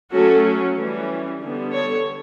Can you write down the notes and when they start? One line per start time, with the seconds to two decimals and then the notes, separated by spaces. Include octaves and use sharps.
0.13 F#3 A3 C#4 F#4 A4
0.77 E3 G3 C#4
1.41 D3 G3 B3
1.72 A4 C#5